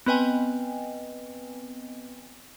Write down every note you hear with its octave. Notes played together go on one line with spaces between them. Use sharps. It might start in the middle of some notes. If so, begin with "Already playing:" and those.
B3 C4 B4 D#5 G5 G#5